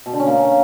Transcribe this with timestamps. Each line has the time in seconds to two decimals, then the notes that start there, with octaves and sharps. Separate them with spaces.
0.06 B2
0.13 D3
0.20 C#4
0.27 A#3